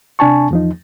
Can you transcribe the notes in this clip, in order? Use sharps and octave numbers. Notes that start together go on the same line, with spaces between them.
C3 D4 G#5 A5 C#6
E2 F3 D#4